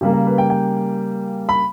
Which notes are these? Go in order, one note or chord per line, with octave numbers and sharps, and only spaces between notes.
C#3 G3 A#3 G4
A#4
B4
G5
G5
B5